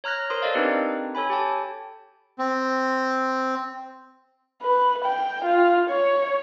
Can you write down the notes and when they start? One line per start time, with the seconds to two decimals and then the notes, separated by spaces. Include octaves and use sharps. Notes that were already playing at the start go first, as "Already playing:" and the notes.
0.04 C#5 A#5 F6 F#6 A#6
0.30 A#4 C5 C6 D#6
0.42 A4 A#4 C5 D5 D#5 F5
0.55 C4 D4 D#4 G4 B4
1.15 A4 C#5 G#5 B5
1.30 G4 G5 A5
2.39 C4
4.62 B4
5.04 G5
5.44 F4
5.90 C#5